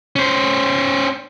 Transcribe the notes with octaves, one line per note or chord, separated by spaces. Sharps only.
C#4 C5